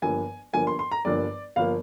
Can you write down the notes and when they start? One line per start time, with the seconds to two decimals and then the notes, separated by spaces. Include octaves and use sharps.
0.02 G1 G2 F3 A#3 G#5
0.53 G1 G2 F3 A#3 G#5
0.67 C6
0.79 C6
0.92 A#5
1.05 G1 G2 F3 A#3 D5
1.56 G1 F3 A#3 F5